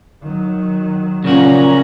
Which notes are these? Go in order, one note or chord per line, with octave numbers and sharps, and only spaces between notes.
D#3 F#3
A#2 C#3 F3 C#4 F#4 A#5